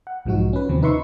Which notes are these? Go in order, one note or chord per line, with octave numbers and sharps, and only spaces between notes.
F#5
B1 G#2 F3 D#4 F#4
C#4 B4
D#2 C3 F3 C4
D#4 B4 E5 C6 C#6